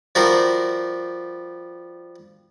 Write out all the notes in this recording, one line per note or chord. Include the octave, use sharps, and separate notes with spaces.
F3 G3 F#4 A#4 C5